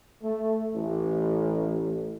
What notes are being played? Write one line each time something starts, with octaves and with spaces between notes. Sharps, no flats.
A3
A1